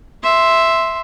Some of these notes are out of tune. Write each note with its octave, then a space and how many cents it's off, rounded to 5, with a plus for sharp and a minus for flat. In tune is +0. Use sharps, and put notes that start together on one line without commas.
E5 +0 C6 +0